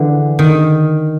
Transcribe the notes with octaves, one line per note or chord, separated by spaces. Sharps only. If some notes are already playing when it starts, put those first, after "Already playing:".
Already playing: D3 E3
D#3